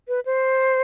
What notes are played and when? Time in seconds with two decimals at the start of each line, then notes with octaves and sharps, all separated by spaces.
0.08 B4
0.26 C5